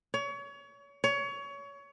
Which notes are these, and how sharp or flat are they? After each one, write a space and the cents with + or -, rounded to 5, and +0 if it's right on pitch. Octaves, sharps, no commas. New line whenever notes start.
C#5 +30
C#5 +25